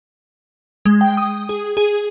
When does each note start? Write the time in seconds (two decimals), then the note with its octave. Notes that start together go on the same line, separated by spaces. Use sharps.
0.85 G#3
1.01 G5
1.17 D#6
1.49 G#4
1.77 G#4